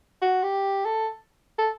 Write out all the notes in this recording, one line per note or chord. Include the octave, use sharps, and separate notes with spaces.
F#4
G4
A4
A4